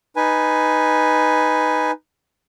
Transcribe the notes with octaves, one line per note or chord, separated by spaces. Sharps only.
D#4 B4 G#5